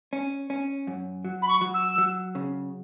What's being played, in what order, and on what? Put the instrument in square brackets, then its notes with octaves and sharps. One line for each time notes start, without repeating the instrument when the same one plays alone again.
[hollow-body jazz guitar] C#4
C#4
F#2
F#3
[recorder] B5
C#6
[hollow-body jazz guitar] F#3
[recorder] E6
[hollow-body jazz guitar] F#3
C#3